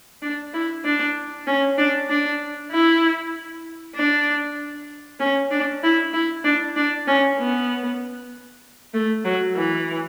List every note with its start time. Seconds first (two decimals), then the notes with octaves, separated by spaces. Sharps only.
0.22 D4
0.53 E4
0.84 D4
1.47 C#4
1.77 D4
2.09 D4
2.71 E4
3.95 D4
5.20 C#4
5.51 D4
5.83 E4
6.13 E4
6.44 D4
6.76 D4
7.07 C#4
7.39 B3
8.94 A3
9.25 F#3
9.56 E3